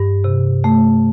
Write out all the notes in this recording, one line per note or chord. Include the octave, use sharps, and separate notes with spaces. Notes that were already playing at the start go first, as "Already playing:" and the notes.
Already playing: G2
C3
A3